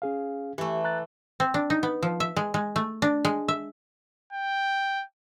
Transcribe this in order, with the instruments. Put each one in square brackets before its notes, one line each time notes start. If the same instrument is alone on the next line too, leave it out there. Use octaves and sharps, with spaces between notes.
[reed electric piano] C#4 G#4 F5
[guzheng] E3 A3 [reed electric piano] G4
[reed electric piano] A#5 F#6 A6
[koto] C4
D4
D#4
B3
F3
E5
G#3
G#3
A3
D4
G#3
E5
[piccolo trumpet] G5